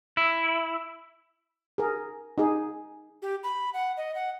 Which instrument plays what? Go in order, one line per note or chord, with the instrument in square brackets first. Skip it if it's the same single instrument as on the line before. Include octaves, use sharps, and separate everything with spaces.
[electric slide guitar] E4
[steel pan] G#4 A#4
D#4 G#4
[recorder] G4
B5
F#5
D#5
F#5